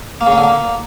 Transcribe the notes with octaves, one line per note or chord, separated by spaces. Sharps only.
A#3
C#3
A#3
D3
A#3